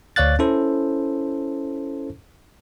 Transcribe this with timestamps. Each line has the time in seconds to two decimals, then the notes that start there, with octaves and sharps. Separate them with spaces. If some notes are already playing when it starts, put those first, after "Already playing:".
0.16 D2 C#5 D5 F5 F#6 A6
0.39 C#4 E4 A4 C5